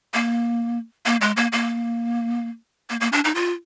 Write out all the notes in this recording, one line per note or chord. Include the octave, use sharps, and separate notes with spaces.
A#3
A#3
G#3
A#3
A#3
A#3
A#3
D4
D#4
F4